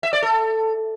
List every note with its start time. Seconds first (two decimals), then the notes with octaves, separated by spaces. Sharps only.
0.03 E5
0.13 D5
0.22 A4